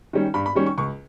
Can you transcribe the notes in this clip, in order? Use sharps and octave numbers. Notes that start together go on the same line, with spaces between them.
D#3 G3 C#4
G2 B5
B5
D#3 G3 C#4 C#6
C#6
C#2 C#6